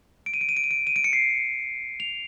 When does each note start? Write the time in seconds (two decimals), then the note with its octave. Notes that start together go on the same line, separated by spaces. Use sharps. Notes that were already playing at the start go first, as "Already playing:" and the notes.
0.26 D7
0.34 D#7
0.41 D7
0.49 D#7
0.57 D7
0.64 D#7
0.71 D7
0.87 D#7
0.96 D7
1.04 C#7
1.13 C7
2.00 F7